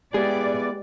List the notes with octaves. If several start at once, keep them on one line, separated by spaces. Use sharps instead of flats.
G#3 B3 G4 G#4 D5